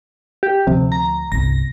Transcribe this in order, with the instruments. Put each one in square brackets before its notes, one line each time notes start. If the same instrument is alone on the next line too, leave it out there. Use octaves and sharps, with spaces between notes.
[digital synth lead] G4
[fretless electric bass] D2 F3 [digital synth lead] C3
[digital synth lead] A#5
[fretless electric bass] G1 C2 [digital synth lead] A#6